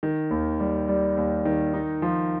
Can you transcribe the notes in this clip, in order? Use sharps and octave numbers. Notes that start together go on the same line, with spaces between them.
D#3
D#2
G3
G3
D#2
D#3
D#4
F3